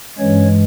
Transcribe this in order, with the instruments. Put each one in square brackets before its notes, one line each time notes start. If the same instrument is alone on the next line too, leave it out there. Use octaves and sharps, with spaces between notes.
[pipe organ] G2 E3 G#3 C#4 C#5